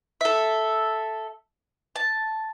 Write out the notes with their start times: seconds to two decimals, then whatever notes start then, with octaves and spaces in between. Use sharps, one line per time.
0.21 A4 E5
1.96 A5